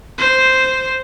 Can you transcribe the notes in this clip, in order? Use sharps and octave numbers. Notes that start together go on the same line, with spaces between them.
C5